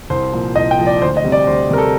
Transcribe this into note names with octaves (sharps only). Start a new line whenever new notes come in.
C2 C5
A#2 F3
C2 D#5
G5
A#2 F3
D5
D2 C5
D#5
C3 G3
D5
D2 C5
C3 G3 A#4
A4